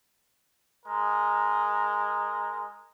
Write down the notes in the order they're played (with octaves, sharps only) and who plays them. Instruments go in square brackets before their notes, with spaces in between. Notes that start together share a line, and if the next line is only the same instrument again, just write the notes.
[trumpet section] G#3 A#4